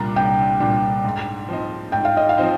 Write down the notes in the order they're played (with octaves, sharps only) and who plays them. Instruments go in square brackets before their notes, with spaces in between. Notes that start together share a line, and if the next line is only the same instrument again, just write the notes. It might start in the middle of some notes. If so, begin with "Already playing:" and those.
Already playing: [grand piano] C2 A#2 G3 D4 F4 [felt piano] A#5
[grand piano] C2 [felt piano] G5
[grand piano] A#2 G3 D4 F4
G#2
F3 C4 D#4
[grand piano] G#2 [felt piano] G5
[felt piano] F5
D#5
F5
[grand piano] F3 C4 D#4